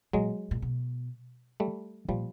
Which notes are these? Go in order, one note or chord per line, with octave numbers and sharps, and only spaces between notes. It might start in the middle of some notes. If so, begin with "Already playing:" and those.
A#2 F#3 G#3
A#2
B2
G3 A3
A#2 F3 G3